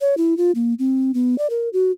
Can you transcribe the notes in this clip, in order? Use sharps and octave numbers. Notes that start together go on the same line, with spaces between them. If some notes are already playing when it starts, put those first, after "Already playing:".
C#5
E4
F4
A#3
C4
B3
D5
A#4
F#4